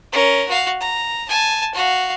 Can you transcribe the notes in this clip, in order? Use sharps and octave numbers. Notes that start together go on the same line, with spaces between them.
C#4 A#4
F#4 F5
A#5
G#5 A5
F#4 F5